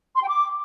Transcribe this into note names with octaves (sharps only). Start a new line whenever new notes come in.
C6
G5
D6